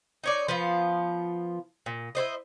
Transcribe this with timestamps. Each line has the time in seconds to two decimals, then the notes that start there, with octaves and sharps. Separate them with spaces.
0.24 D#4 C#5 D5
0.48 F3 B3 F4
1.86 A#2
2.15 E4 F#4 C5 D#5